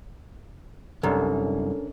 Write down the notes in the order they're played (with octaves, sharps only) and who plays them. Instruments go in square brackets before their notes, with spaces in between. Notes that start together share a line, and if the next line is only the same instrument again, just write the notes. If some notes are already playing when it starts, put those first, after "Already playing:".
[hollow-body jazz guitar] C2 F#2 [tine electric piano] C#4 D4 A#4 [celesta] A4